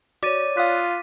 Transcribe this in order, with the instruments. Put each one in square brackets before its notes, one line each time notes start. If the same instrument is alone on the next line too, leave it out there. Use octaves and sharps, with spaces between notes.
[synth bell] F#4 [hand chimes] C#5 D5 [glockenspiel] D6 A6 D#7
[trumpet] F4 [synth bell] F5 D#6 F#6 [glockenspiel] B6